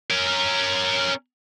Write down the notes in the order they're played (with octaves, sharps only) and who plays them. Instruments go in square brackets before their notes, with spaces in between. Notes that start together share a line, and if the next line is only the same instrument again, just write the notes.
[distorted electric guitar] C#4 A#4